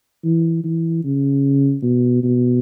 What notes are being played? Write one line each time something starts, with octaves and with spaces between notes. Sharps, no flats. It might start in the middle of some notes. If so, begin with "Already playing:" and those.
E3
E3
C#3
B2
B2